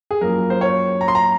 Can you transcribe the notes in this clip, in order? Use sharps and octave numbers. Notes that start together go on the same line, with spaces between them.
G#4
F#2 F3 A#3 A#4
C5
C#5
A#5
C6
A#5